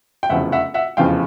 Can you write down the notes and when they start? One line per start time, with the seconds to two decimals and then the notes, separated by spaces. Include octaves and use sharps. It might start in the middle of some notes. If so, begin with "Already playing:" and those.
0.23 G5
0.29 F1 E2 C#3 F3 E5 F#5
0.52 E5 F#5
0.74 E5 F#5
0.97 F1 E2 C#3 F3 F5 G5